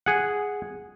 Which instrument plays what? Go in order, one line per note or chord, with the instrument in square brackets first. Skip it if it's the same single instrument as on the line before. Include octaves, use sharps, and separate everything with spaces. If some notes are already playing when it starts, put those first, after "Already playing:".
[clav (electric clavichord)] G#4 F#5